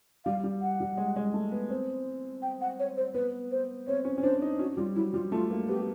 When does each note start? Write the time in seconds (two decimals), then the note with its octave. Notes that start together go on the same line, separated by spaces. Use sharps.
0.25 G3 F5
0.44 G3
0.61 F#5
0.80 G3
0.97 G#3
1.16 G#3
1.34 A3
1.52 B3
1.70 C4
2.42 G5
2.61 F#5
2.79 C#5
2.97 C5
3.14 B3 B4
3.51 C5
3.87 C4 C#5
4.05 C#4
4.18 C#4
4.23 D4 C5
4.42 D#4
4.59 C#4 F#4
4.77 G3 F4
4.95 F#3 E4
5.14 G3 F4
5.32 A3 F4
5.50 A#3
5.68 B3 G4